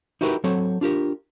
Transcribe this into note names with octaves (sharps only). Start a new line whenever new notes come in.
D#4 E4 F#4 G4 A#4 B4
F#3 C4 A4 C#5
D4 F4 G4 A#4